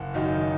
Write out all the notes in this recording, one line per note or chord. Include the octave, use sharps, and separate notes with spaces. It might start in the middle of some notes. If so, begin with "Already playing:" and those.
Already playing: F#1 F#5
F#2 D#3 F#3 D#4